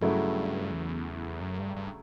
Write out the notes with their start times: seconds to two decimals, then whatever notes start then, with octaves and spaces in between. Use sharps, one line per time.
0.01 G2 C#3 F#3 A3 E4
0.71 E2
1.41 F#2
1.58 G2
1.76 G2